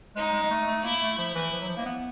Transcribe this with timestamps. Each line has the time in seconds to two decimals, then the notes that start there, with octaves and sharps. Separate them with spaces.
0.16 G#3 D#4
0.32 G#3
0.43 G#3
0.51 A3
0.67 A3
0.84 A#3 E4
1.01 A3
1.18 F3 E4
1.35 E3
1.52 F3
1.60 F#3
1.68 F3
1.77 A#3
1.86 B3